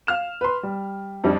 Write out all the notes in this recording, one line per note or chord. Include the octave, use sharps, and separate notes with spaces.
F5 F6 E7
B4 C6
G3
F2 G3 D4